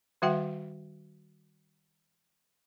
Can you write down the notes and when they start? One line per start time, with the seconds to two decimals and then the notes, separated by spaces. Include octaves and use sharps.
0.22 D#3 G3 F#4 E5 F#5 G5